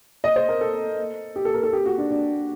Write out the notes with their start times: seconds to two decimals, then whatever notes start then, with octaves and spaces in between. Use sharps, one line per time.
0.24 D#5
0.36 C5
0.49 A#4
0.61 A4
1.36 G4
1.45 A4
1.54 A#4
1.63 A4
1.73 G4
1.86 F#4
1.98 D4
2.10 D4